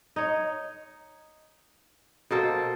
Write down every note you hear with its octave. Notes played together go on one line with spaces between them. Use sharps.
D#4 C#5
B2 A#3 A4 C5